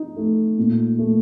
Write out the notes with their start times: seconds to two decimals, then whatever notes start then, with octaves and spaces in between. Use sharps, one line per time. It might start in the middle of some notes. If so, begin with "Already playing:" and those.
Already playing: D#4
0.17 A3
0.58 A#2
0.99 A3